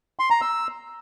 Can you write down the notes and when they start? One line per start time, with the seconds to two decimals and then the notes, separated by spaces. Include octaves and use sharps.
0.19 C6
0.30 A#5
0.41 E6